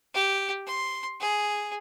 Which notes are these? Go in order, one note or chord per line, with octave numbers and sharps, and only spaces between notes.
G4
C6
G#4